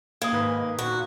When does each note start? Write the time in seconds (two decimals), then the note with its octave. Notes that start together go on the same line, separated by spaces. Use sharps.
0.22 A#3 D#6 G#6
0.33 G#2 D#3 B4
0.79 A#2 F#4